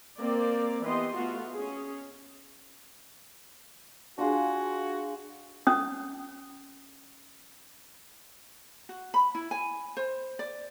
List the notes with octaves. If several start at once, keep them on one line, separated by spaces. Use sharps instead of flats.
A#3 C4 D5
E3 B3 G4 D#5 C6
A3 B3 F4 F#4
C#4 G#4
D4 F4 F#4 G#4
C#4 D#6
F#4
B5
E4
G#5
C5
D5